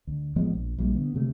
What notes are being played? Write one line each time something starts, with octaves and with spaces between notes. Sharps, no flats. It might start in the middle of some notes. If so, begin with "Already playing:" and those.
D2
A1 F3 G#3 B3
A#1
A#1 G3 A#3
D3 B3
D2 C3 F#3 A3